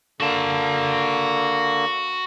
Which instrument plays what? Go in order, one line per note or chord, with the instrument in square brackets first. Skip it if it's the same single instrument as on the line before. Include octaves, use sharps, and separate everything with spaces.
[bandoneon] D3 A#3 [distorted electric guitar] F#4 A5